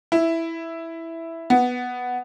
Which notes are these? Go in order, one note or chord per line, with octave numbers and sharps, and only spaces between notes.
E4
B3